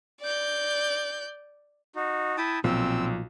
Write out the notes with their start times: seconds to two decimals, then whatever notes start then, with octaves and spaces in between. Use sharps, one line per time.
0.21 D5 G6
1.96 D#4 F#4
2.37 E4 G5 A5 D#6
2.64 B1 A#2 F3 C4 E6